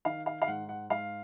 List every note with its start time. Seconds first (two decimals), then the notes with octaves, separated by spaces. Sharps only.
0.05 D#3 F5
0.26 F5
0.42 F5
0.48 G#2 F#5
0.69 F#5
0.90 G#2 F5